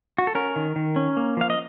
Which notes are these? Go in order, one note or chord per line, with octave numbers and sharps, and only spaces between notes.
F#4
A4
C#4 A#4
D#3
D#3
C#4
A#3
F3 F5
D#5